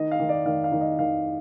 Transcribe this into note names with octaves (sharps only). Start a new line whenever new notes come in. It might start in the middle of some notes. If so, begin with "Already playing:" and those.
Already playing: D#3 D#5
F5
D#3
D5
D#3 F5
F5
D#3
D#5
D#3 F5